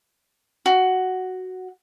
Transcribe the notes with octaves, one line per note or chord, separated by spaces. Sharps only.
F#4